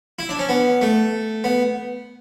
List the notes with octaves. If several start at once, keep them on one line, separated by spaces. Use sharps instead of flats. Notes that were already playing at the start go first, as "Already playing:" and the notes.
E4
D4
C#4
B3
A3
B3